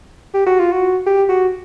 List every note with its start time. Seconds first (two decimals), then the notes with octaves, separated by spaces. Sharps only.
0.34 G4
0.46 F#4
0.59 F4
0.72 F#4
1.06 G4
1.29 F#4